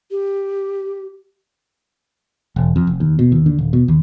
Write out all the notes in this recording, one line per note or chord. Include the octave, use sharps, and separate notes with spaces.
G4
E1
F2
F1
D#2
B2
D#2
D3
D#1
B2
D#2